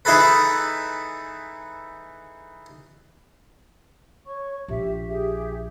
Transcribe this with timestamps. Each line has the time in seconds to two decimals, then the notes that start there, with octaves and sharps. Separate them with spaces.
0.05 E3 D#4 E4 G#4 A4 B4
4.26 C#5 C#6
4.68 A#1 G4 E5
5.08 G4 G#4 E5